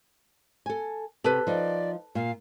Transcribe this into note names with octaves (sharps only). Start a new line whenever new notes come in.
A4 G#5
C3 G4 A4 B4
F3 D#4 D5
A#2 F5